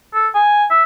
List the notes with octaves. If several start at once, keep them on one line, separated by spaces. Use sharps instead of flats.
A4
G#5
E5